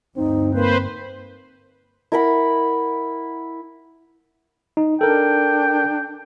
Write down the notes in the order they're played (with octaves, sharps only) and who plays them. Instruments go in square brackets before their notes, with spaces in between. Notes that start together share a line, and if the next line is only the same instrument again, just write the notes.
[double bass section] D2 G2 [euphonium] C4 [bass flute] D#4
[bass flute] A#3 [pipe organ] B4 C5
[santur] E4 A#4 F#5 B5
[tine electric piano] D#4
[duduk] D4 [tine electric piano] A4 A#4 [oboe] G5